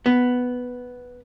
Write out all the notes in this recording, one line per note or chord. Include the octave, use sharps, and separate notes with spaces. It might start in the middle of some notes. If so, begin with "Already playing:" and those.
B3